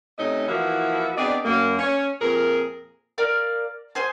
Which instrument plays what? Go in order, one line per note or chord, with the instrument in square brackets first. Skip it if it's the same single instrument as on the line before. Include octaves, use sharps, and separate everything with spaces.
[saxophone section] C3 A3 C#4 D#4 D#5
E3 F3 A#3 E4 F#4
B3 C4 D4 G#4 D5 D#5
F#2 A#3
C#4 C#5
F2 A#2 G#4 A#4
[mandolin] A#4 D5 F5
G#4 C5 G#5